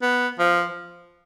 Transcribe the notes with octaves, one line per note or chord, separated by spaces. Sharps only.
B3
F3